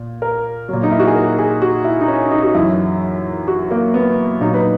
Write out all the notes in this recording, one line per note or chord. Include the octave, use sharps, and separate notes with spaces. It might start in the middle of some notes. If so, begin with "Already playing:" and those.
Already playing: A#2
A#4
A#2 F#3
D#4
E4
F#4
G#4
A#4
G#4
F#4
E4
D#4
C#4
D#4
F#4
F#2 E3 E4
F#4
A#3
B3
A#2 F#3 D#4
B4